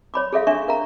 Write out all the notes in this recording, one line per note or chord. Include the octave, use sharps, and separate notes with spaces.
C#5 B5 D6
G#4 A4 E5 F5
D4 E5 C#6
A#4 F5 A#5